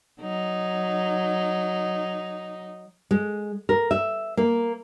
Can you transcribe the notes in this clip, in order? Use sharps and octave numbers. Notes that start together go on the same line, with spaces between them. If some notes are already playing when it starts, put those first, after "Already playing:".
F#3 D#4
G#3
A#4
E5
A#3